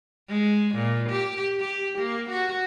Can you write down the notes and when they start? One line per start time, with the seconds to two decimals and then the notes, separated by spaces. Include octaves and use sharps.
0.29 G#3
0.75 A#2
1.10 G4
1.60 G4
1.99 A#3
2.30 F#4